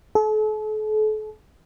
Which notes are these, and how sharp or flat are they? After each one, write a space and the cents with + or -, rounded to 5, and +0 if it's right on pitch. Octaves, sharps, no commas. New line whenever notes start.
A4 -40